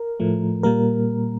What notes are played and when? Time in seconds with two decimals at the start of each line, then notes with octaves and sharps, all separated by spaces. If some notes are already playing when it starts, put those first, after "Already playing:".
Already playing: A#4
0.20 A2 F3 A3
0.63 A#2 G3 A#3 A#4